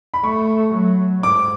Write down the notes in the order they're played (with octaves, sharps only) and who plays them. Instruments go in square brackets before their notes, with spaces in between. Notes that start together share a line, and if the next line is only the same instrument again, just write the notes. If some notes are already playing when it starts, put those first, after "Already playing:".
[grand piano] B5
[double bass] A3 [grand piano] C#6
[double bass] F#3
[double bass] G#2 [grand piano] D6